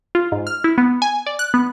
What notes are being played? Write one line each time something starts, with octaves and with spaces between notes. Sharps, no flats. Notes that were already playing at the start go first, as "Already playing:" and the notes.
F4
G#2
F6
E4
B3
G#5
D5
F#6
B3